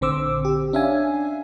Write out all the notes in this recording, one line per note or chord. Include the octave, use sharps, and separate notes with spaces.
A#1 D3 C4 C5 D6 E6
G4
C#4 D4 E5 F5 G#5